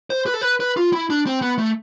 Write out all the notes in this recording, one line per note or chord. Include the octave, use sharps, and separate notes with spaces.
C5
B4
A4
B4
B4
F4
E4
D4
C4
B3
A3